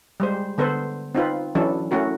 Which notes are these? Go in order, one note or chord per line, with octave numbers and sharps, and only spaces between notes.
G3 G#3 C5
D3 B3 A4 B4 C5
C4 D#4 F4 B4
E3 F#3 C#4 D4 A4
A3 C#4 E4 F#4 A#4